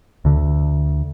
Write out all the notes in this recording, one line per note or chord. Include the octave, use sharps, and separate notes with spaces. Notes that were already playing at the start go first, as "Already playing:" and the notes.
D2 D3